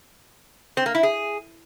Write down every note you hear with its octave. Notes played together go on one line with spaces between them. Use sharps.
C4
A#3
E4
G#4